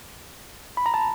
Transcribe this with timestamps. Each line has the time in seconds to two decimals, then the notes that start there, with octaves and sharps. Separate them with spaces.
0.77 B5
0.86 A#5
0.94 A5